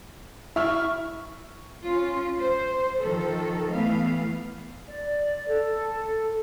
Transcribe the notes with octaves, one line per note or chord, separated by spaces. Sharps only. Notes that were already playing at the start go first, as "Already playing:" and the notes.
E4 E5 C#6 F6
C#4 F4
C5
D#3 F3 A4
E3 A3 B3 F5
D5
A4